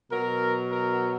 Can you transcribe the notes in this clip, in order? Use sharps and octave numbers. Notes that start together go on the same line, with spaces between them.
B2 F#3 A#4
A#4